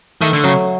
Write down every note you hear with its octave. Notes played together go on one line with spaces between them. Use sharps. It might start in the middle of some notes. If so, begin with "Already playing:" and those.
D#3 A3
D3
C#3 F#3